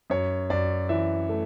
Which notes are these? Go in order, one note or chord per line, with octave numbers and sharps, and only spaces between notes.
F#2 C#5
F#2 D5
E3 E5
A3